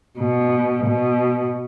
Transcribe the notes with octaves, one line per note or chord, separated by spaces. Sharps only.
B2
B2